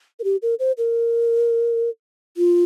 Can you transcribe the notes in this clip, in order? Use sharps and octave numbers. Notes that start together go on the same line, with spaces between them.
A#4
G4
A#4
C5
A#4
F4